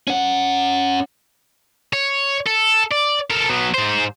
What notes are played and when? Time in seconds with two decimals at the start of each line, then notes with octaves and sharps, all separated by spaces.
0.07 C#4 F#5
1.93 C#5
2.46 A4
2.91 D5
3.30 A4 A#4
3.49 F#3 B3
3.74 G#2 C5